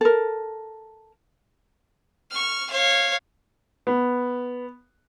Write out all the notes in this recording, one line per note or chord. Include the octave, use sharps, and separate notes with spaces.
A4 A#4
C#6 F6
C#5 F5
B3